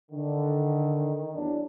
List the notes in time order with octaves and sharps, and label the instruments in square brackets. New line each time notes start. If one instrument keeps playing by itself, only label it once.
[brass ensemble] D3 [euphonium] D#3
[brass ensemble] E2 F#3 [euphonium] D4